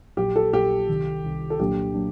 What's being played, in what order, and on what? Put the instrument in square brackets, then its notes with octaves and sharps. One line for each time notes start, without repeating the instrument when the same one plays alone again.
[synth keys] A#1 A#2 F#3 [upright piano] G4
[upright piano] A4
[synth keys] A#1 A#2 F#3 [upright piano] G4
[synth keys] C2 C3 D#3
C2 C3 D#3
[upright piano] A4
[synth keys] C2 A#2 F#3 A#3 D4 [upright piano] G4
[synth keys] F#3 A#3 D4